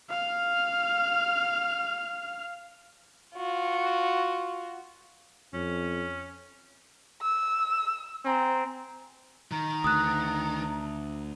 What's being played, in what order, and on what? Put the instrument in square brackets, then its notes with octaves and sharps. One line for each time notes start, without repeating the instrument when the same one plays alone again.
[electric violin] F5 F6
[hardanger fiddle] F4 F#4
[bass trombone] F2 [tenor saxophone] C#4
[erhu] E6
[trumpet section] C4 G#5 A#5
[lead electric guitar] D#3 [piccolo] A#5
[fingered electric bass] D2 [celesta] D#6 F#6